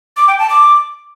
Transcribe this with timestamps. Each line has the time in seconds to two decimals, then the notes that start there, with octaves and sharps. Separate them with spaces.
0.17 D6
0.28 G5
0.39 A5
0.49 D6